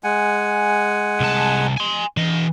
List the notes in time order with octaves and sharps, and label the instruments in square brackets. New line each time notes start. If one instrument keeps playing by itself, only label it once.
[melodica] G#3 F#5 G#5
[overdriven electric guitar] C2 A5
G#5 C6
E3 D#5